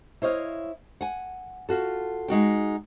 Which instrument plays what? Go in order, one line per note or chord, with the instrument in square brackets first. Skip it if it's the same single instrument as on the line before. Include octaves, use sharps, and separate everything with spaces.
[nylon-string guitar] E4 C5 C#5 D#5 F5
F#5 G#5
F4 F#4 A4
G#3 D#4 F#4 G5